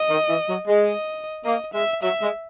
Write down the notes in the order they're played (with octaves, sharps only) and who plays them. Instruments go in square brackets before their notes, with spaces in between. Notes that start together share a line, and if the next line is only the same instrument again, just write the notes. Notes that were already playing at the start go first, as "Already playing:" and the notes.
Already playing: [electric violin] D#5
[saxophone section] D#3
E3
F#3
G#3
[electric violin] D#5
[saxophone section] A#3 [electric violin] D#5
[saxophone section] G#3 [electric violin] E5
[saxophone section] F#3 [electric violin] E5
[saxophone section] G#3